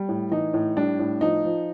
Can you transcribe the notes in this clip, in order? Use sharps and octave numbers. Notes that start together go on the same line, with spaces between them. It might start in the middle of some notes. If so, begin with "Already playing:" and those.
Already playing: G3
A2
E3 D#4
A2
G3 D4
A2
F3 D#4
F3